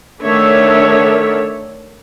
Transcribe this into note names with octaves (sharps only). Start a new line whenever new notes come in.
D3 D#3 A3 D4 C#5 E5